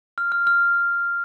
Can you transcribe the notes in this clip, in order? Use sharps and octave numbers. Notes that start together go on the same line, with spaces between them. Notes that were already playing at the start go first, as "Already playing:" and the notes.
F6
F6
F6